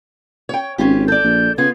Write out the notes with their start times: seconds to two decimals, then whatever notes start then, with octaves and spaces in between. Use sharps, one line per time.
0.49 C#5 G5
0.78 G#1 C#4 F4 G4
1.08 A4 D5 G6
1.24 A#1
1.58 C#3 B3 F4 G#6